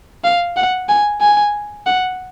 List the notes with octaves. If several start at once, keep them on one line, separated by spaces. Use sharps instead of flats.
F5
F#5
G#5
G#5
F#5